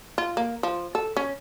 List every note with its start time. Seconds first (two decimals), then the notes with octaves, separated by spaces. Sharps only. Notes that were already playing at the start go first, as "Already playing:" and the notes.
0.18 F4
0.37 A#3
0.63 F3
0.95 A4
1.16 C#4